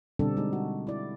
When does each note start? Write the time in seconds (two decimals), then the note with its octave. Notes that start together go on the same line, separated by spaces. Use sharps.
0.19 B2 D3 G3 C4 D4 A4
0.37 G#3 D#4
0.53 F#4
0.87 E4 D5